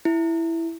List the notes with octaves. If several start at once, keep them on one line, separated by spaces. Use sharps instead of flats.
E4